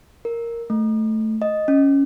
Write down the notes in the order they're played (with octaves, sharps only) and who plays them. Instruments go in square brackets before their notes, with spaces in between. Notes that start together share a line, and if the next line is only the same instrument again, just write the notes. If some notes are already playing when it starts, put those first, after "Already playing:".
[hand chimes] A#4
A3
D#5
C#4